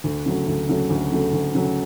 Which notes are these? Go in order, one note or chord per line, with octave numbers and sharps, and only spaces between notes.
D2
C#3 F#3 A3
D2
C#3 F#3 A3
D2
C#3 F#3 A3
D2
C#3 F#3 A3